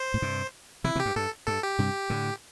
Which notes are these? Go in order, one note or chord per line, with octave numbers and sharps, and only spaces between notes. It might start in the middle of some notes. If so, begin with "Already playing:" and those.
Already playing: C5
A2
G2 C3
C3 E3 E4
C3 E3
G4
G2
G2 A4
G2 A4
G4
G2 C3
A2 D3